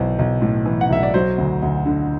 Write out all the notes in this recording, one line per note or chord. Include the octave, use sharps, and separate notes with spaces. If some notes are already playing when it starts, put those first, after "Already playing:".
Already playing: B1 E3 C5
B1
A2
E3
F#5
B1 E5
D5
F#3 C5
D2
D2
D3